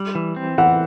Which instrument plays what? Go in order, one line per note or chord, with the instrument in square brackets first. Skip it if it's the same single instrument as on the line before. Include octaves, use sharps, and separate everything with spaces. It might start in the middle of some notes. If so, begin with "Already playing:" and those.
Already playing: [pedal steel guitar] G3
E3
C4
[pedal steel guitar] E3 [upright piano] F#5